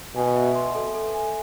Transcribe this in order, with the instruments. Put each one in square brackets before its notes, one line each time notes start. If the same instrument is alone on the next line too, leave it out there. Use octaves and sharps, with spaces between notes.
[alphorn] B2 [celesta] G#5
[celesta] E5
C6
A4
A4
G#5